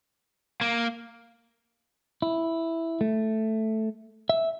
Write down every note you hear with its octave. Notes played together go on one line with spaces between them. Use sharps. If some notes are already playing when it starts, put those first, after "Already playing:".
A#3
E4
A3
E5